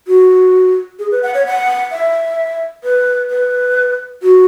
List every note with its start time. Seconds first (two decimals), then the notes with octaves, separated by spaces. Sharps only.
0.07 F#4
0.99 G#4
1.11 B4
1.23 F#5
1.34 C#5
1.46 F#5
1.92 E5
2.84 B4
3.30 B4
4.23 F#4